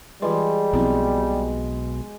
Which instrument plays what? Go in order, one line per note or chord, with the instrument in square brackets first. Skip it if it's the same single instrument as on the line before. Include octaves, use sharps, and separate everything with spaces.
[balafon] E3 F4 B4 [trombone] G3 [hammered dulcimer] G#3
[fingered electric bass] B1 B2 [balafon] F3 C4 E4